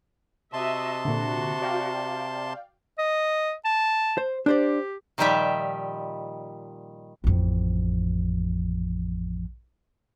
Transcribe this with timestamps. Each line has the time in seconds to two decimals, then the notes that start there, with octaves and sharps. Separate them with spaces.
0.53 C3 F#4 D#5 E5 A5 C6
1.05 A#2 D3 F#4
1.62 D5 F5 G5
2.99 D#5
3.65 A5
4.18 C5
4.46 D4 G4 C5 D5
5.18 A#2 D#3 F3 G3 G4 E5
7.24 A1 F2